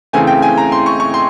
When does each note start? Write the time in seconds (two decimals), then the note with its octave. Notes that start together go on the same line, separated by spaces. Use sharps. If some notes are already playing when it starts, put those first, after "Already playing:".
0.13 C#3 E3 A3 C4 G#5
0.27 G5
0.42 G#5
0.58 A#5
0.72 C6
0.86 C#6
1.00 C#6
1.14 C6